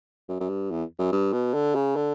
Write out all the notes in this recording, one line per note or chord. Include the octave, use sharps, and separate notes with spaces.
F#2
F#2
G2
E2
F#2
G2
B2
D3
C#3
D3